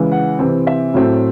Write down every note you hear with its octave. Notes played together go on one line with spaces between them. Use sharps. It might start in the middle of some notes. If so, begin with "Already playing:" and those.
Already playing: C#3 E3 G#3
F#5
C3 E3 C4
E5
A2 F#3 A3 C4